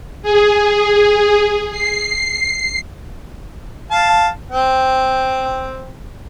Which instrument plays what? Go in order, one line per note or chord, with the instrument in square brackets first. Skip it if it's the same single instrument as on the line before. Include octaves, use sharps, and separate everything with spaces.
[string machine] G#4
C7
[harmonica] F5 A5
C4 G5